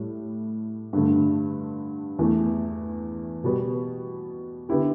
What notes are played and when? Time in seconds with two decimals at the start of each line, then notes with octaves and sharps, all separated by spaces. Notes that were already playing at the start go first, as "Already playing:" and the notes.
Already playing: A2 G3
0.93 G2 D3 A3
2.19 E2 E3 A3
3.44 B2 G3 B3
4.69 D3 B3 E4 G4